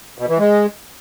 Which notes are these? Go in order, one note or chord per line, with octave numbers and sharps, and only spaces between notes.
B2
E3
G#3